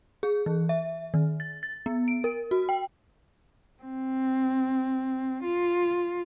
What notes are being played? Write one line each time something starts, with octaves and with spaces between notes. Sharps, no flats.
G#4
E3
E5
D#3
A6
A6
B3
D7
A#4
F#4
G5
C4
F4